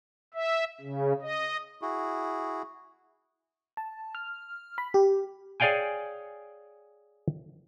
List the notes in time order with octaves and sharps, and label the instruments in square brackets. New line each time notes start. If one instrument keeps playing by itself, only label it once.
[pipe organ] E5
C#3
D#5
[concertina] E4 F#4 G#4
[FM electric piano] A5
F6
B5
G4
[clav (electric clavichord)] G#4 C#5 D5 F5 G5 G#5